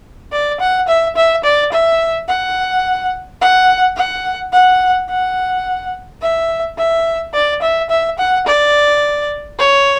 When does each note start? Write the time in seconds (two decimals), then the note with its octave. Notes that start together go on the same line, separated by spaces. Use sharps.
0.32 D5
0.60 F#5
0.88 E5
1.15 E5
1.44 D5
1.72 E5
2.28 F#5
3.41 F#5
3.96 F#5
4.52 F#5
5.09 F#5
6.21 E5
6.78 E5
7.34 D5
7.62 E5
7.89 E5
8.18 F#5
8.46 D5
9.58 C#5